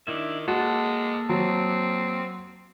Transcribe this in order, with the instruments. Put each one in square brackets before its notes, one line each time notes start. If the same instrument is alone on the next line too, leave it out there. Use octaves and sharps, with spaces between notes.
[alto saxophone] D#3 [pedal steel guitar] D4 E4 E5
[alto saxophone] G#3 [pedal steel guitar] A#3 A4 [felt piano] F#4
[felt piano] F#3 [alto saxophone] C4